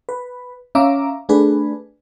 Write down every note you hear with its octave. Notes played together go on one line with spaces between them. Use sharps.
B4
C#4 E5 F5 A#5 D6
A3 D4 G#4 B4